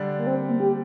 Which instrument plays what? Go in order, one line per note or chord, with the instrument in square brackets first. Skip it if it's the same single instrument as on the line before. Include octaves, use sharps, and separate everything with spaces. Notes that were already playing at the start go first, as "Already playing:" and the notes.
Already playing: [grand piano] D3 G3 D4
[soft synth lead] A#3
C4
A#3
G4